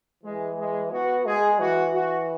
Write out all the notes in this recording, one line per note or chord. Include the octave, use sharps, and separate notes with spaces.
E3 G#3
G#3
B3 F#4
G#3 G#4
E3 F#4
F#4